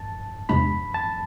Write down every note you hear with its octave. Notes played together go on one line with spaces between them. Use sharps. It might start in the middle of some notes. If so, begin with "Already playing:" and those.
Already playing: A5
E2 C3 G#3 D4 B5
A5